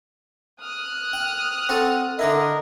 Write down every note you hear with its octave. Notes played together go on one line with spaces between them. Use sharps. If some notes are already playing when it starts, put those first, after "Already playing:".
D#6 F6 F#6
G5
C4 F#4 A4
D3 D#4 E4 A#4 D#5